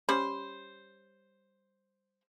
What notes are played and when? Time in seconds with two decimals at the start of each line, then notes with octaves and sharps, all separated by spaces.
0.09 G3 C#4 C5 B5